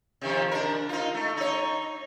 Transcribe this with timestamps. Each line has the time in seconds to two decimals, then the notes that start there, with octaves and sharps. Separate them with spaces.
0.22 C3 D#3 F3
0.51 D4 A#4
0.89 D#4 F4
1.14 A3
1.37 D#4 C#5